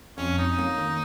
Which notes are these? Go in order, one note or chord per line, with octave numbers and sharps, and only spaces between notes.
F2 C#4
C#4 D#4
A#3
D#3